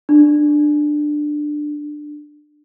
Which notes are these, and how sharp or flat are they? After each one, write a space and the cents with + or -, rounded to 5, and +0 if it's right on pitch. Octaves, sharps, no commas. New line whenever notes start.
D4 +15